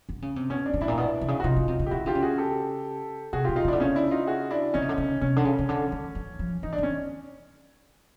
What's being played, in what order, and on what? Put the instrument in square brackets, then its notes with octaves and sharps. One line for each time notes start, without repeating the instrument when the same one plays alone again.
[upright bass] D3
C#3
C3
[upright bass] B2 [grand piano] C#4
[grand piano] D4
[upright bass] A#2
[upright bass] A2 [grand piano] D4 E4
[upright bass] A#2
B2
C3
C#3
[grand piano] F#4
[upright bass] C3 [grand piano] D#4 F4
[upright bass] C#3
C3
C#3
[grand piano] G4
[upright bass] D#3 [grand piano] E4 F#4
[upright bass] D3 [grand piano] F4 G4
[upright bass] C#3
[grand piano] F#4 G#4
G4 A4
[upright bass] C3 [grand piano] F#4 G#4
[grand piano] F4 G4
[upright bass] B2
[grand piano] D#4 F4
[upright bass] C#3
[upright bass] D3 [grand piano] D4 E4
[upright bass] C#3 [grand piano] C#4 D#4
[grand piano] D4 E4
D#4 F4
F#4 G#4
D4 E4
[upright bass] D3 [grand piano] C#4 D#4
[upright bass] C#3
D3
C#3
[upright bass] C3 [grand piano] C#4
[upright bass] D3
C#3
C#3
D3
D#3
E3
F3
[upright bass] E3 [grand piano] D#4
[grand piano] D4
[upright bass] D#3 [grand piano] C#4